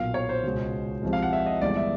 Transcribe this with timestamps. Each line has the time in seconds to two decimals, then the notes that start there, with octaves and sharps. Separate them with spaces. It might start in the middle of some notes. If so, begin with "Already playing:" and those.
Already playing: B1 A#2 F#3 F5
0.14 C#5
0.29 C5
0.44 C#2 B2 G#3
1.02 C2 C3 F3 G#3
1.13 F5
1.23 F#5
1.33 E5
1.46 D#5
1.61 G1 G2 E3 G#3 D5
1.77 E5